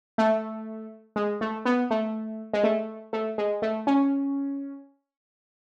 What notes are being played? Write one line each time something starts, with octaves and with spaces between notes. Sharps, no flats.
A3
G#3
A3
B3
A3
G#3
A3
A3
G#3
A3
C#4